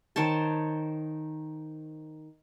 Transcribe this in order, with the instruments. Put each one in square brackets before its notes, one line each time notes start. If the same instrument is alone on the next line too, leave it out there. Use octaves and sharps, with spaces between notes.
[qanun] D#3 C5 C#5 A5